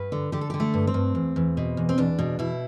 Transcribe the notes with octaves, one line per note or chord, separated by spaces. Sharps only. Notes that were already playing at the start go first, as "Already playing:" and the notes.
Already playing: G2 B4
D3
D3 G4
A4
D3 G4
A3
G2
C4
G2
E2
E2
B2
E2
C4
E2 D4
B2
B2 E4